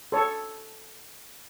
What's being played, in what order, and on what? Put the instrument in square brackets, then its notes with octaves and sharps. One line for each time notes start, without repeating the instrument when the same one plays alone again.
[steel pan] A4 C#5